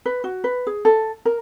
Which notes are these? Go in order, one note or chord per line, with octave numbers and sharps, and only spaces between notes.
B4
F#4
B4
G#4
A4
A#4